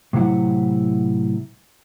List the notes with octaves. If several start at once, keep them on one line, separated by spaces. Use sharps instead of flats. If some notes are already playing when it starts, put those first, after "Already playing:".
A2 C3 F#3 E4 F#5